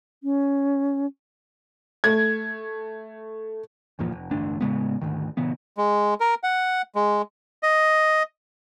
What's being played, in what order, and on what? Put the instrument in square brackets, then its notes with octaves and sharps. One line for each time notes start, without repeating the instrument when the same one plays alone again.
[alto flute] C#4
[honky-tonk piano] A3 G#6
[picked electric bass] G1 E2 A#2 F3
F1
A1 D2 G2 D4
A2 C#3 G#3 B3
D2 G#2 D#3
A#2 C#3 E3 B3
[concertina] G#3
A#4
F#5
G#3
D#5